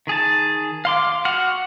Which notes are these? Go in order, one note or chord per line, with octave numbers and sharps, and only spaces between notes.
D#3 G#4 A5
F5 C6 D6
F#4 F#5 F6